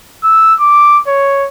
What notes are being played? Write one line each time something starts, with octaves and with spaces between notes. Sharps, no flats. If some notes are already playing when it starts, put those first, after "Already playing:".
E6
D6
C#5